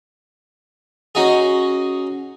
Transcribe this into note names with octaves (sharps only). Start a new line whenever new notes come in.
C#4 D#4 F#4 G#4